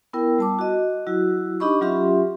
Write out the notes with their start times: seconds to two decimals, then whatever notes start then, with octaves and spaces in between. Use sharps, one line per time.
0.13 B3 E4 A#4 G5
0.39 G3 A5 D6
0.59 F#4 D#5
1.07 F#3 E4 F#4
1.60 D4 D#4 G4 D#5 B5 C#6
1.81 F#3 C#4 F4 G4 E5 C6